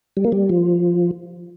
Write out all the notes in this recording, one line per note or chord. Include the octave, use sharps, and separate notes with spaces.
G3
A#3
G3
F3